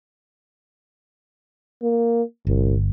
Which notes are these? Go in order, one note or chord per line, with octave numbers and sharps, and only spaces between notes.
A#3
G1 C2